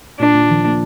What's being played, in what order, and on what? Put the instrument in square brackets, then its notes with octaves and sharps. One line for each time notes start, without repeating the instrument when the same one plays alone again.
[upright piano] A#2 [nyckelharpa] D4
[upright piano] A#2
F3
A#3